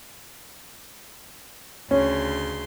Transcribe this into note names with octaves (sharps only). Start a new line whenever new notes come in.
D2 C#3 C#4 C6